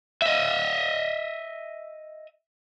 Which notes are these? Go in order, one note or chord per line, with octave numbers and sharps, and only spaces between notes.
D#5 E5